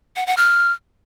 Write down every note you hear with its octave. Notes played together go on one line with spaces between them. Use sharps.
F#5
F#5
F6